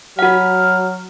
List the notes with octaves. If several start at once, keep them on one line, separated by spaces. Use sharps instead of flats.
F#3 F#4 F#5 F6